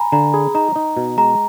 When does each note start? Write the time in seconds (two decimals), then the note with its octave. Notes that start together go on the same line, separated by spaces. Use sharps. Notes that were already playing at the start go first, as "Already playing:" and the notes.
Already playing: G#5 A#5 B5
0.12 D3 A#5
0.33 G#4 B5
0.55 D#4 A#5
0.76 D#4
0.97 B2
1.18 G#3 A#5